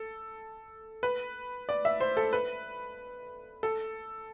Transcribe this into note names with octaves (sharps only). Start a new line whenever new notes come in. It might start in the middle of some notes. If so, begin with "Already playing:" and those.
Already playing: A4
B4
D5
E5
C5
A4
B4
A4